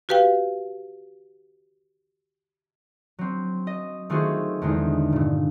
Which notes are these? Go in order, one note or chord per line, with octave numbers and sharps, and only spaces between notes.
F#4 G4 B4 F5 G5
F#3 C4
D#5
D#3 A3 F4 F#4 G#4 C5
E2 D3 G#3 D#4
G2 A#2